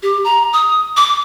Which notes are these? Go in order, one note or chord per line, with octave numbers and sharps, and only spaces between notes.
G4
A#5
D#6
D6